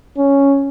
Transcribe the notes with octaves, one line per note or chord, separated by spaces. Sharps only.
C#4